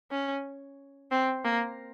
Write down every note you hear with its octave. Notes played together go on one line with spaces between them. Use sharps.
C#4
C4
A#3